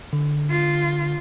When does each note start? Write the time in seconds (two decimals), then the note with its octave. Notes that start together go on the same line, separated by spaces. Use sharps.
0.13 D3
0.50 F4